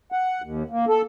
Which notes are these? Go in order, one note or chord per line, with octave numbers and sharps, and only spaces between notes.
F#5
D#2
A#3
A4